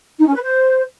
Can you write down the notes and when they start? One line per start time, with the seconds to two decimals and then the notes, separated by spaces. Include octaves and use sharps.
0.19 D#4
0.26 C#4
0.34 B4
0.42 C5